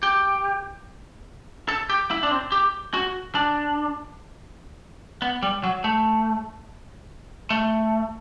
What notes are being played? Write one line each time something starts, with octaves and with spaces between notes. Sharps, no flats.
G4
A4
G4
E4
D4
C4
G4
F#4
D4
B3
G3
F#3
A3
A3